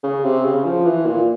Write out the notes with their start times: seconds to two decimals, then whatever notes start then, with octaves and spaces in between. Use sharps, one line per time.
0.03 C#3
0.24 C3
0.44 C#3
0.65 F3
0.85 E3
1.06 A#2